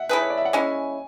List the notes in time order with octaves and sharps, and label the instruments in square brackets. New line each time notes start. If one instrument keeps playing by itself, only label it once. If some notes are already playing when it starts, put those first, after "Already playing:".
Already playing: [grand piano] E5 F#5
[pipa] A3 E4 G#4 B4
[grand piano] C#5
D5
E5
F#5
[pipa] G#3 C#4 E4 [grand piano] G#5